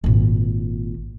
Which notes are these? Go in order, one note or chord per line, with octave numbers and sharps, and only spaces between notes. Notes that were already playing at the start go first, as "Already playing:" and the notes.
G#1 A#2